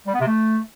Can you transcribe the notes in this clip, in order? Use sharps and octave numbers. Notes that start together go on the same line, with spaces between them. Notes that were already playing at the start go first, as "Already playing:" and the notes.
G3
B3
C3
A3